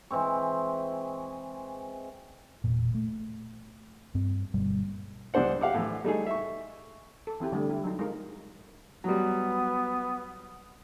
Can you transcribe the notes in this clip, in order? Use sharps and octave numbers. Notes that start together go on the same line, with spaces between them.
E3 G#3 C4 C#6
E1 A#2
A3
G2 C4
G1 B2 G3 A#3
C#2 G3 D4 C5 F#5
G4 F5 F#5 D6
A2 E3
G3 A3 D#4 G#4
E5 C#6
A4
E3 C4 E4 G4
D3 G3 A3
E4 G4
F#3 D4 D#4
G#3 D#4 F4 A#4
F#3 G3 B3